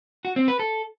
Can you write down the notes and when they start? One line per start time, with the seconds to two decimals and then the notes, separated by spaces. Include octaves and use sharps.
0.25 F#4
0.36 C4
0.48 B4
0.59 A4